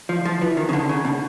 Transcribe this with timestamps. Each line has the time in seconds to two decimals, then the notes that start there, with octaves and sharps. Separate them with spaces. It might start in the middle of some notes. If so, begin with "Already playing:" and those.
0.09 F3
0.25 F3
0.41 E3
0.57 D#3
0.69 C#3
0.73 D3
0.89 C#3
1.05 B2